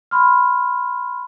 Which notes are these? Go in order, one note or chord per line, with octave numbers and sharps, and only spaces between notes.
B5 C6 F6